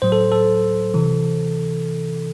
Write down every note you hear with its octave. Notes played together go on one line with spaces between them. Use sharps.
A2 F#3 C5
A4
A4
C3 E3